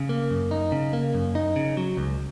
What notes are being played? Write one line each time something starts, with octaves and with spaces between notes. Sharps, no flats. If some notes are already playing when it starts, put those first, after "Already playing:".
Already playing: C#3
A#3
F#2
D#4
C#3
A#3
F#2
D#4
C#3
F#3
C#2